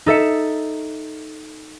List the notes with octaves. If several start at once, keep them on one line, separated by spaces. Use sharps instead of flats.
D#4 A4 E5 C#7